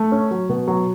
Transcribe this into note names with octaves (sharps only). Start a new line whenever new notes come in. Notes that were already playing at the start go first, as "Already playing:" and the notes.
Already playing: A3
C#4
F#3
B2
F#3